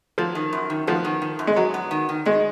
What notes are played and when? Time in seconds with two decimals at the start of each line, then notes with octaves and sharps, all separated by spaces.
0.18 F3 F#3
0.35 D#3
0.53 F#2
0.70 D#3
0.87 F3 B3
1.04 D#3
1.22 D#3
1.39 F#2
1.47 G#3
1.56 F#3 B3
1.74 B3
1.91 D#3
2.09 D#3
2.25 D#3 G#3